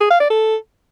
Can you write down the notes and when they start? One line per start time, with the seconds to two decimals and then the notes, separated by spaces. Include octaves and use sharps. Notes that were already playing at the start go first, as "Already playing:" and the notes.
0.01 G#4
0.11 F5
0.20 D5
0.30 A4